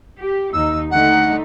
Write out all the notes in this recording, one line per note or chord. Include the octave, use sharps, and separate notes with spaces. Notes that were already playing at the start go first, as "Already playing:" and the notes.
G4
D#2 D#4 E6
D3 A3 D#4 F#5